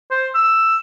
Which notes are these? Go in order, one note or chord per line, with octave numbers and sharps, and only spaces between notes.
C5
E6